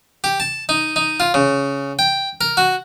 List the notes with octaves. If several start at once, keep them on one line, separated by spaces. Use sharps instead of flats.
G4
A5
D#4
D#4
F4
C#3
G5
A#4
F#4